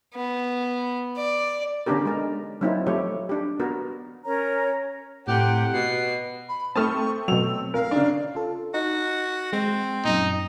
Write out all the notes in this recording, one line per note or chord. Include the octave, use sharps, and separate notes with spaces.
B3
D5
D3 B3 C#4 D4 G4 A#4
G#3 A#4
F#3 A#3 C4 D#4 E4
F3 A3 G4 C#5
D4 G4
B3 F#4 A#4
C#4 A#4 C#5 A#5
A2 C3 G4 F#5
B2 C7
B5
A3 C4 A5 C#6 D#6 F6
B2 F#3 E6 F7
A#4 F5
C#3 D4
F4 A4
D#4 F#4
G#3 C4
F#2 A#2 D#4